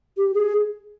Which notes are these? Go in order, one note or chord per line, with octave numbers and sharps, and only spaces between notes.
G4
G#4